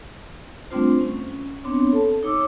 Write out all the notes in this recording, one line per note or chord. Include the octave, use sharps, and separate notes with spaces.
G3 A3 C4 D4 F4 C5
C#4
B3 C4 D4 C#5
A4 A5
D#4 C#5 D6 E6